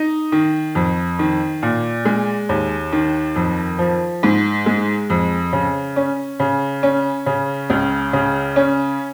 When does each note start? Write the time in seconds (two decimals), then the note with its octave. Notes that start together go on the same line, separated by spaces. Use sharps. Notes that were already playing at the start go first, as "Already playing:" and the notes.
Already playing: D#4
0.32 D#3
0.75 F2
1.19 D#3
1.63 A#2
2.05 G#3
2.49 D#2
2.92 D#3
3.36 F2
3.79 F3
4.23 G#2
4.66 G#3
5.10 F2
5.53 C#3
5.96 C#4
6.39 C#3
6.83 C#4
7.26 C#3
7.70 C#2
8.13 C#3
8.56 C#4